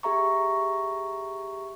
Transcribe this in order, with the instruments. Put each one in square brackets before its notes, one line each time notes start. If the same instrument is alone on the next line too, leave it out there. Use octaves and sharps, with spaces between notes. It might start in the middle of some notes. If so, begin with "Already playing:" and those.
[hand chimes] G4 G#4 E5 A#5 C#6